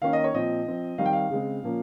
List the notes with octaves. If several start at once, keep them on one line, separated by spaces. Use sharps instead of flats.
D#3 A#3 C#4 F5
D#5
C#5
A#2 F3 C4 D#5
F3 C4
D#3 G3 C4 F5
G5
F5
C#3 G#3 C4
A#2 F3 A#3 C#4